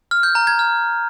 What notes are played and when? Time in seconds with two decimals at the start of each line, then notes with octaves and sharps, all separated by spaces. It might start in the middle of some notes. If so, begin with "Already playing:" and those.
0.11 F6
0.23 G6
0.35 A#5
0.47 G#6
0.59 F6